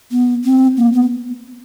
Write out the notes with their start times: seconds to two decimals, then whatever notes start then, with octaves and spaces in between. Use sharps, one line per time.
0.12 B3
0.45 C4
0.77 A#3
0.93 B3